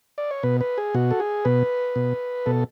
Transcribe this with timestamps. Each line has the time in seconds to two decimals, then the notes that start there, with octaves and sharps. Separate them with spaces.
0.18 D5
0.31 C#5
0.43 B2 B4
0.61 B4
0.78 G#4
0.94 B2 F#4
1.11 A4
1.20 G#4
1.45 B2 B4
1.96 B2
2.46 B2 A4